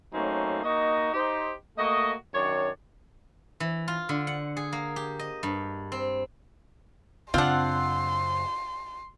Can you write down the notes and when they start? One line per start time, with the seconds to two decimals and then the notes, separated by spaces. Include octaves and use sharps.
0.13 F#3 A3 A#3 C4 C#4 D#4
0.64 A#3 D#4 F#4 D#5
1.14 D#4 G4 C5
1.78 A3 A#3 F#4 D#5
2.34 F#2 D#3 D4 C#5
3.60 E3
3.88 F4
4.09 D3
4.27 F#5
4.57 G#4
4.73 A#3
4.96 G4
5.19 D#5
5.43 G2
5.92 C4
7.34 F#2 C#3 C4 D4 F4 F#5 C6